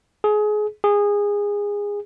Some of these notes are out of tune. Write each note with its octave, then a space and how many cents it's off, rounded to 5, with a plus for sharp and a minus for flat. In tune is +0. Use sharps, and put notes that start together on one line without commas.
G#4 +25
G#4 -20